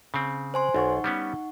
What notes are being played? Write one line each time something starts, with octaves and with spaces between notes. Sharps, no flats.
C#3 C4
C5 G#5 C6
B1 D#4 F#5 C#6
G3 B3 C#4